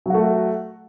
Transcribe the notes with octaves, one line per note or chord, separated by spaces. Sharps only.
F#3 A3 F#4